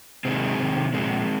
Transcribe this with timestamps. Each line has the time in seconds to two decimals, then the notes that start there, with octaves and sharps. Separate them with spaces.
0.25 C3 D#3 G#3 C4
0.60 C3 D#3
0.93 A#2 F3 G#3 C4